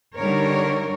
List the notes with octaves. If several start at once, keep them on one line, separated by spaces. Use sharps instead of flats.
D3 G3 D#4 A#4 C#5